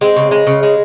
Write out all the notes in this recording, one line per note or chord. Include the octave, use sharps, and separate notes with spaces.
G#3 C4
C#3
G#3
C#3
G#3